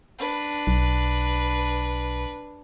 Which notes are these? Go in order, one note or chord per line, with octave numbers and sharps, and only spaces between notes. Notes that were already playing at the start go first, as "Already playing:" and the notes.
D4 B4
B1